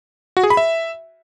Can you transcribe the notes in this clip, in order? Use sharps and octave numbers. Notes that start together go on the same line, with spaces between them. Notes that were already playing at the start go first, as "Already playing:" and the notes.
F#4
G#4
B5
E5